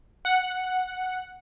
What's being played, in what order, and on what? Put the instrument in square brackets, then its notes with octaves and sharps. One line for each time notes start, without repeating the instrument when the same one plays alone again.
[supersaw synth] F#5